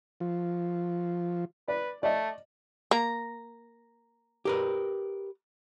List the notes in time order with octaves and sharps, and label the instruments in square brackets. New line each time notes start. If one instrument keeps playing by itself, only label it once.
[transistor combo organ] F3
[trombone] B4 [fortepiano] D5
[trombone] A3 [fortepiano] D5 D#5
[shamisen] A#3 [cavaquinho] A#5
[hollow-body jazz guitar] G4 A#4 B4